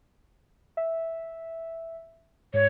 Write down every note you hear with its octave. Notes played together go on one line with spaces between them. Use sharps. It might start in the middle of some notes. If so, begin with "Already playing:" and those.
E5
G#2 C#5